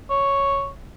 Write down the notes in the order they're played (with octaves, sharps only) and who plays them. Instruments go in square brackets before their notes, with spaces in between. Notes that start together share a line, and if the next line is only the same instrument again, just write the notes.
[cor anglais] C#5